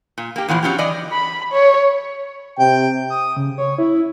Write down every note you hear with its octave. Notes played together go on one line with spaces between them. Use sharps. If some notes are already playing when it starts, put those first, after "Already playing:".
A#2
A#3 G4
E2 A#2 E3 F3
F#3 C#4 E4 F4 G4
E3 D5 D#5
B5
C#5
C3 G5
D#6
C#3
C#5
E4